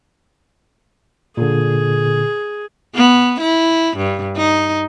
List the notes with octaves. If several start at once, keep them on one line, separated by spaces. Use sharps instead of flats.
A#2 D3 G#4
B3
E4
G2
D#4